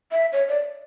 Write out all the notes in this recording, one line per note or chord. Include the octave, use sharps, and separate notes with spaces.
E5
C#5
D5